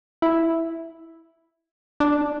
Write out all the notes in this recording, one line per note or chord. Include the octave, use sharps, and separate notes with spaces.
E4
D4